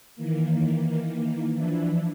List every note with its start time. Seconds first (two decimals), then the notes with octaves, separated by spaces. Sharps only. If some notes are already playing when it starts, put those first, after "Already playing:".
0.16 D#3 E3 A#3
1.54 E3 F3 D4 E4